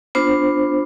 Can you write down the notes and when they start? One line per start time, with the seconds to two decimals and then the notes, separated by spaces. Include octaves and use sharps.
0.15 B3 D4 F4 C5